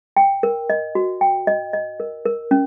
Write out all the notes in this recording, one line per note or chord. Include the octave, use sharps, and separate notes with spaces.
G5
A#4
D#5
F#4
G5
D#5
D#5
A#4
A#4
C#4